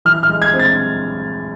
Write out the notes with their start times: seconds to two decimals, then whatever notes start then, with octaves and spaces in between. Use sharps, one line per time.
0.05 E3 F6
0.23 F6
0.29 G#3
0.42 G#6
0.53 C4
0.59 A6